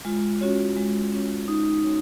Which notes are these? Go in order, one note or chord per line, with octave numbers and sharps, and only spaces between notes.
G#3 F4
C#4 F#4 C#5
G#3
C#4 F#4 C#5
G#3 D#4
C#4 F#4 C#5